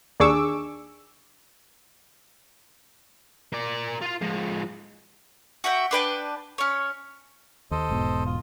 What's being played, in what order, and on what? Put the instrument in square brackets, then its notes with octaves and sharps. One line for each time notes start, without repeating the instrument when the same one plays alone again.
[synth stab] D#2 D4 G#4 C#6 D6 E6
[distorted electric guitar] A#3 D5
F4 F5
F3 G#3
[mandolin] F#4 E5 F#5 G5
D4 B4 G5 A5
C#4 C#5
[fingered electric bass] D#2 [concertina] A4 C5 D#5
[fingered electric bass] E1 G#2 B2
[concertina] F4